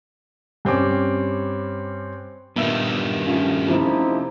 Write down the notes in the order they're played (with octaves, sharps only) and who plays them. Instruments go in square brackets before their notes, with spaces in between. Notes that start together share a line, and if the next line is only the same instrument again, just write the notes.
[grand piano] G2 C4 C#4 D6
[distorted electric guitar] G2 D#3 [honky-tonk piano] A#2 [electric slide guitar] B3 E5
[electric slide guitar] A3 C#4 [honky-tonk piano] F4
[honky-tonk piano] F2 C3 [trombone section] F3 D#4 E4